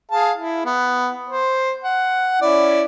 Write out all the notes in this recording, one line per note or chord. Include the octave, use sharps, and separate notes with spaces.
G#4 F5 A5
E4
B3
C5
F#5
C#4 E4 D5